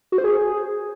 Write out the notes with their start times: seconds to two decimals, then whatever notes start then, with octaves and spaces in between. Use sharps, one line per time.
0.12 F#4
0.18 C5
0.24 G#4